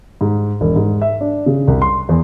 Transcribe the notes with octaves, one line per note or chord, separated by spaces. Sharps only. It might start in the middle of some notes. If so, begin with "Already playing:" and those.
G#2
E1
G#2
E5
D4
C#3
C2
C6
E2